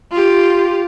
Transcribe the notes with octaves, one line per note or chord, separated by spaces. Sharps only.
F4 G4